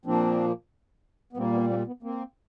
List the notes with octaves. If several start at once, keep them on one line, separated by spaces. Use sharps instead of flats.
A#2 F3 A#3 C4 D4
B3
A#2 G3 A#3 C4
B3
A#3 C4
B3
A#3 C4